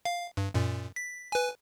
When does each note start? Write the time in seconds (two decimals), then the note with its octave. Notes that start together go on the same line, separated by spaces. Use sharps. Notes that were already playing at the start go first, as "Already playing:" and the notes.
0.05 F5
0.37 G2
0.54 F#2 A#2
0.96 B6
1.32 B4 G#5